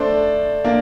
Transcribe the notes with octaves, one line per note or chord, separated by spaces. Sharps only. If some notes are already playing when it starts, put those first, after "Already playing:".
Already playing: A3 D4 A4 C5
A#3 D4